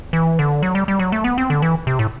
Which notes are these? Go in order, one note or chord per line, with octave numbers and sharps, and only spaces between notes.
E3
D3
F#3
G3
G3
F#3
A3
B3
C4
D3
E3
C3
A2